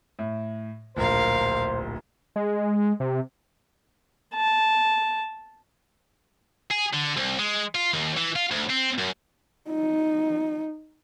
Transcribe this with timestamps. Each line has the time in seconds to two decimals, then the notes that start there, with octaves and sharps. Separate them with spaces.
0.19 A2
0.97 D1 A#1 A#4 C5 F5
2.36 G#3
3.00 C3
4.34 A5
6.71 G#4
6.94 D3
7.17 C2
7.39 G#3
7.75 F4
7.93 D#2
8.17 E3
8.36 F4
8.51 D2
8.70 C4
8.98 F#2
9.70 D#4